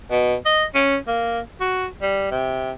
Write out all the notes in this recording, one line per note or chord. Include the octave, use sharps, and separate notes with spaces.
B2
D#5
C#4
A#3
F#4
G3
C3